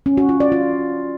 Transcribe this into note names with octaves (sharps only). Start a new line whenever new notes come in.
C#4
F#4
F4
D5
F4